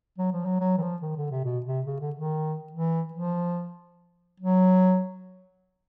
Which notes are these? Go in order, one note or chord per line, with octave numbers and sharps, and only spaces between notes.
F#3
F3
F#3
F#3
E3
F3
D#3
D3
C3
B2
C3
C#3
D3
D#3
E3
F3
F#3